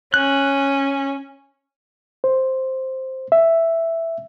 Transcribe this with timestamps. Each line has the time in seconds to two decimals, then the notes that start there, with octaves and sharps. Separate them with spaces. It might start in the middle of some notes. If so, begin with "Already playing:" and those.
0.14 C#4 F#6
2.24 C5
3.32 E5